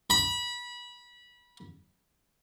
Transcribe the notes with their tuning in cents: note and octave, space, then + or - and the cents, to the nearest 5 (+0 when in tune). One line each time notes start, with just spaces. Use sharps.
B5 -25